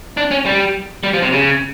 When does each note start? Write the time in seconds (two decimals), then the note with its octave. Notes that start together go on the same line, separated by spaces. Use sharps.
0.17 D4
0.31 C#4
0.46 G3
1.03 G3
1.13 F3
1.23 C3
1.32 C#3